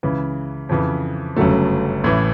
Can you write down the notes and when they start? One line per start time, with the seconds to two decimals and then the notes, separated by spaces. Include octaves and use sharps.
0.03 C#2 C#3 E3
0.69 F2 C#3 E3
1.37 G1 F#2 C#3 F#3 A3
2.04 A1 A2 E3